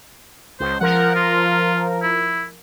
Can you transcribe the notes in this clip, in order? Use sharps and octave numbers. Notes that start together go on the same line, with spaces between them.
C#2 C5
F3 A#4 F#5
F4
E4